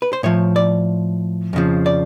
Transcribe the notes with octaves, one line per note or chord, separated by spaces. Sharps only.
B4
C5
A2 F3 C#5
D5
F2 C#3 F3
D5